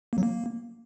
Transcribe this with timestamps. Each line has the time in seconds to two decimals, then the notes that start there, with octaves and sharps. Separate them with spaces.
0.13 A#3
0.18 F#3
0.23 A#3